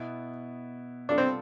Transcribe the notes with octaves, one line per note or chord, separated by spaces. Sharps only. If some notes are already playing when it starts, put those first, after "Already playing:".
Already playing: B2 B3 E4
C3 G3 B3 D4 F4 A4
C4